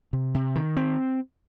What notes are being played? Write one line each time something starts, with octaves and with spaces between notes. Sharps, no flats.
C3
C3
D#3
C4